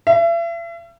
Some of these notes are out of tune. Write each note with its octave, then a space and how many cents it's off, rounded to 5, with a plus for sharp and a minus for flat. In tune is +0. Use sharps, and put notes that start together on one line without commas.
E5 +40